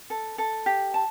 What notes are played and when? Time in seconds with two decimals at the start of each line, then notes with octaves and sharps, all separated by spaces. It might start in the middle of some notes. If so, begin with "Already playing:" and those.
0.10 A4
0.38 A4
0.66 G4
0.94 A5